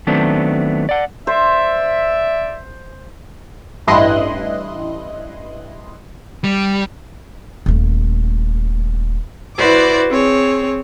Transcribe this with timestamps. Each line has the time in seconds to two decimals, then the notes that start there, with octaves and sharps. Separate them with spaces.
0.07 D#3 F#3 A3 B3 C4 D4
0.89 D5 F#5
1.27 C5 D5 E5
3.87 A1 G2 E4 D#5 C6 F#6
6.44 G3
7.66 D#1 A3
9.57 E4 F#4 B4 C5 D5 D6
10.09 C4 G#4 C#5